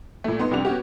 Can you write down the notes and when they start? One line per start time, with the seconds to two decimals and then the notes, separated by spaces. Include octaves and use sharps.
0.24 A#2 A3
0.39 B3 D#4 C6
0.51 C2 F2 G3 D4 F#5 F7
0.65 B3 C#4 F#4 G4